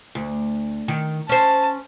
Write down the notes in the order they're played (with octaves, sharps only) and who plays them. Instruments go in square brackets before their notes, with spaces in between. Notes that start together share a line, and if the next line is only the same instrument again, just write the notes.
[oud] D2
D#3
[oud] C#4 C5 [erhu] A5